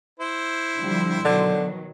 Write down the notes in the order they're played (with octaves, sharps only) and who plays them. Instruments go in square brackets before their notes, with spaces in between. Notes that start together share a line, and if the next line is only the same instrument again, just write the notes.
[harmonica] E4 C5
[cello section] D3 F3 G3
[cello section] B2 D#3 F#3 [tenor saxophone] D3